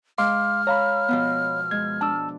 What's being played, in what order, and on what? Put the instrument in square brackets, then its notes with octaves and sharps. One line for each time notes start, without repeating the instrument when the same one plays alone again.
[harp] G#3 [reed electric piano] F5 C6 D6 [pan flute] F6
[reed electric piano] C#5 F5 B5 [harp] A#5
[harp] B2 F3 B3
[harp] G#3 [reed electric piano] G#6
[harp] D4 [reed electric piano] A5 E6